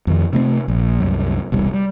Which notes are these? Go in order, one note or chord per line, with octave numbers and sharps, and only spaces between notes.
F2 D#3
C3 A3 A#3 C4
A#1
C2 F#2
E1 C2 G3
G3